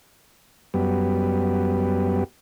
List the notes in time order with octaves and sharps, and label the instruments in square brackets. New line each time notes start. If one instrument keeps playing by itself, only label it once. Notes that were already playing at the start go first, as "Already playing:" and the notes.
[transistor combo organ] F#2 G3 B3